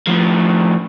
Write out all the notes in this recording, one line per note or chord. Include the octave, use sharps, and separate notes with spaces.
A2 F3